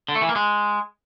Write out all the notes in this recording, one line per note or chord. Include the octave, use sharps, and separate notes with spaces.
D3
A3
E3
A#3
G#3